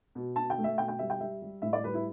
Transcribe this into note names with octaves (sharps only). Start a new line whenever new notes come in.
B2
B2 A5
G5
A3
E5
B2 G5
G5
G3 E5
G5
G3 E5
G3
A2 E5
D5
G3 B4
E4